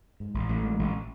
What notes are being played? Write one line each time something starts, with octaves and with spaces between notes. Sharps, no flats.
G#2
A1
A1
G#3
A1